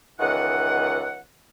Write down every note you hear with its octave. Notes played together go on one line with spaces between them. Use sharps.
C#2 D#3 E3 F#5